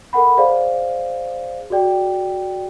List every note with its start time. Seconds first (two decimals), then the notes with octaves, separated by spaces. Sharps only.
0.13 A4 A#4 F#5 B5
0.37 G#4 C5 D5 F5
1.70 F#4 G#4 D5 G5